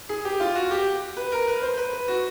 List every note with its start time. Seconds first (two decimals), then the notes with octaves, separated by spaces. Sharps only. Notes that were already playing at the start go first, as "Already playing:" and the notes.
0.09 G#4
0.25 G4
0.40 F4
0.55 F#4
0.71 G4
1.17 B4
1.32 A#4
1.47 B4
1.62 C5
1.77 B4
1.93 B4
2.08 F#4